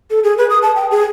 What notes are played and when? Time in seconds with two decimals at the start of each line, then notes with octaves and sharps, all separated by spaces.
0.10 A4
0.24 G#4
0.38 B4
0.50 D#6
0.63 A5
0.76 G5
0.91 G#4